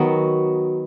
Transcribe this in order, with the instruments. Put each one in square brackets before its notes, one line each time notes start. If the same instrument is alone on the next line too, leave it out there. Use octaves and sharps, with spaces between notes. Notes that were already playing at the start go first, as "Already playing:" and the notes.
Already playing: [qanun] D#3 F#3 B3 F#4